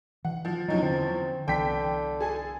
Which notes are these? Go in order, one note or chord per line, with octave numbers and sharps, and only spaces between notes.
E3 F#5
F3
E2 F3 F#3 C#4 D#4
D3 C4
C2 D3 E3 B3 G5 B6
G#4 A4 G#5